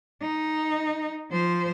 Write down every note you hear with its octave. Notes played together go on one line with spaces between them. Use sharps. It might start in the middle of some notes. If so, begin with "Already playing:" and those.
D#4
F3 C5